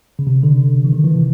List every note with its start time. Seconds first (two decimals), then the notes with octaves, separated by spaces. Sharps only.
0.19 C#3
0.27 C3
0.43 D3
0.84 E3
0.93 D#3
1.04 E3
1.15 C3